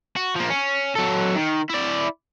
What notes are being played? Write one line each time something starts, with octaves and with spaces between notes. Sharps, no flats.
F#4
F3 A#3
C#4
F#3 A4
D#3
E4 D5